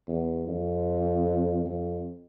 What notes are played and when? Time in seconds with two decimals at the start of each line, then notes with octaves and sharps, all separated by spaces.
0.08 E2
0.48 F2
1.65 F2